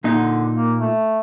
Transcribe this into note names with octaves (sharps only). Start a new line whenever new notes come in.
A#2 D3 D#4
A#3
A3